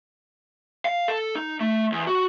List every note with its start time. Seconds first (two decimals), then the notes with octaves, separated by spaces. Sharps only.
0.85 F5
1.08 A4
1.36 D#4
1.60 A3
1.92 E2
2.07 F#4